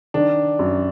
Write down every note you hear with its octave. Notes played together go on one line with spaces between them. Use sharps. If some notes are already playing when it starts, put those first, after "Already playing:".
D#3 D4
F#2